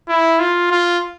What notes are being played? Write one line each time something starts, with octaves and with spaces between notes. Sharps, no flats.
E4
F4
F4